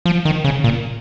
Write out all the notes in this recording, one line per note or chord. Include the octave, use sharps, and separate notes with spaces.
F3
D#3
C#3
A#2